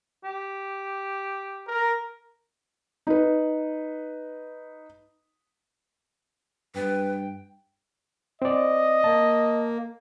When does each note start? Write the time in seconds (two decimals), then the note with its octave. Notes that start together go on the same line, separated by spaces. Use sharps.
0.24 G4
1.68 A#4
3.07 D#4 B4
6.75 G2 B4 G5
8.42 C4 D5 D#5
9.04 A#3 A5